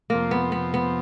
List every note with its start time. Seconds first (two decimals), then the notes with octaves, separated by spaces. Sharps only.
0.10 F2 C3 F3 A#3
0.31 B3
0.52 B3
0.74 B3